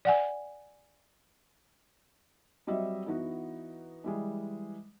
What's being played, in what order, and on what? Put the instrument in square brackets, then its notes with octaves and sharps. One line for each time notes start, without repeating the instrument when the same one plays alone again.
[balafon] D5 F#5 G#5
[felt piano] F#3 G3 C4 D#5 E5
E3 B3 D#4 F#4
E3 G3 G#3